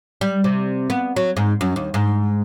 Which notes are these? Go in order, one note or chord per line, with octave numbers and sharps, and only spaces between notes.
G3
C3
B3
F#3
G#2
F#2
D#2
G#2